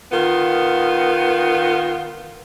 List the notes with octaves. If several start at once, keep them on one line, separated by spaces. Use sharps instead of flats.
D#3 B3 F4